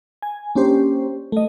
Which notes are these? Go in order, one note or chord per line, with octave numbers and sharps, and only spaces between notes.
G#5
A#3 C#4 D4 G4 C5
A3 D#5